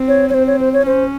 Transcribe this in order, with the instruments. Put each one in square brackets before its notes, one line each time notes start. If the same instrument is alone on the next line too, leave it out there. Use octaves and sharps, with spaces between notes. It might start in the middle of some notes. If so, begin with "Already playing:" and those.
Already playing: [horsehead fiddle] C4
[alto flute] C#5
C#5
[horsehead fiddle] C4 [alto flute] C5
[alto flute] C#5
C5
C#5
[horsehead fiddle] C#4 [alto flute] C5